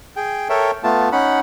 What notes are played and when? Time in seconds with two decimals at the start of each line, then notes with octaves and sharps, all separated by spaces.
0.16 G#4 G5
0.50 A4 A#4 C#5 E5 G5
0.83 A3 B3 F4 A5
1.12 C#4 D#4 F#5 B5